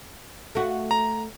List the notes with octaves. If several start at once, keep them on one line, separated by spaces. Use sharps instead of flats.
A3 F#4
A#5